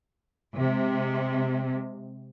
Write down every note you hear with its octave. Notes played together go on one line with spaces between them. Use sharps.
C3 G#3